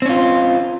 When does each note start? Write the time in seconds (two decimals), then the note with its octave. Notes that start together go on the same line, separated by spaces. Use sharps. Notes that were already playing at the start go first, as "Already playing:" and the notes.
0.02 C4
0.06 C#4
0.09 F4